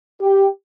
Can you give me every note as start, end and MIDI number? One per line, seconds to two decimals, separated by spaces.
0.21 0.48 67